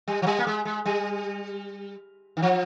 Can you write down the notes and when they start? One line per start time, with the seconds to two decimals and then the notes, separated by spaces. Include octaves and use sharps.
0.08 G3
0.22 F3
0.27 G3
0.39 A#3
0.47 G#3
0.65 G#3
0.86 G3
2.37 D#3
2.42 F3